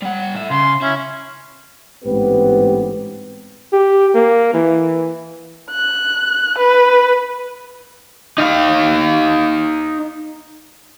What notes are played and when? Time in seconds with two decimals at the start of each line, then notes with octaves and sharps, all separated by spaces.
0.02 G3 F#5
0.36 A2 E5
0.51 C#3 C6
0.82 C#4 E4
2.04 A1 G#2 B3 C4 G4 B4
3.73 G4
4.15 A#3
4.54 E3
5.71 F#6
6.58 B4
8.38 D#4 F5